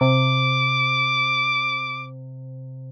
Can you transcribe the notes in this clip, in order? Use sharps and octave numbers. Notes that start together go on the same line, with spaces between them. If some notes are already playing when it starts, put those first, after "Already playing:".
C3 D6